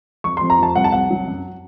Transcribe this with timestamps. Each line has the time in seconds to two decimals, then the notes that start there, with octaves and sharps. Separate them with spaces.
0.24 F2 C#6
0.37 C6
0.41 F2
0.50 A#5
0.58 F3 A5
0.75 C2 F#5
0.84 A5
0.92 C2 F#5
1.10 F#3
1.27 F#2